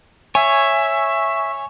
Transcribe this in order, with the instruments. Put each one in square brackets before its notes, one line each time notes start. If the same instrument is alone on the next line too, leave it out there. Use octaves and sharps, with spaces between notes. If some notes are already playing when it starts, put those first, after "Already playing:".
[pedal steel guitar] C#5 [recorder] E5 [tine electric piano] G#5